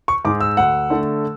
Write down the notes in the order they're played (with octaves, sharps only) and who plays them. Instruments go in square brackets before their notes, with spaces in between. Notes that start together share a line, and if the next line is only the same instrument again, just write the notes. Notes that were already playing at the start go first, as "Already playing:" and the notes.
[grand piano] C#6
G#2 G#3 D6
E6
D2 F#5
D3 A3